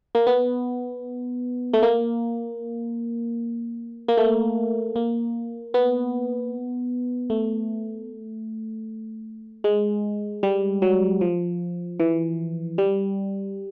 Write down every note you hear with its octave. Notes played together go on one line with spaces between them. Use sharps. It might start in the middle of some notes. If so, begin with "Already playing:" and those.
A#3
B3
A3
A#3
A#3
A3
A#3
B3
A3
G#3
G3
F#3
F3
E3
G3